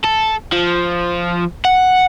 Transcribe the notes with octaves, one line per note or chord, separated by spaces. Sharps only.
A4
F3
F#5